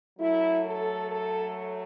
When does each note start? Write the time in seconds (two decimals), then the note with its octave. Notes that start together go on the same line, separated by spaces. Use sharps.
0.19 F#2 F#3 A3 E4
0.65 A4
1.11 A4